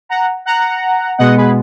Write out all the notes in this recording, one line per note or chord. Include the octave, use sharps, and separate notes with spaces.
F#5 A#5
F#5 A#5
B2 G#3 B3 D#5 F#5
G#4 B4